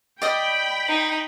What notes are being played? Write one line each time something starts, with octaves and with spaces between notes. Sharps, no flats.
D5 D#5 G5 B5 D#6
D#4